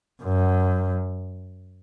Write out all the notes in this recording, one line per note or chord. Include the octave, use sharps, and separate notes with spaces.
F#2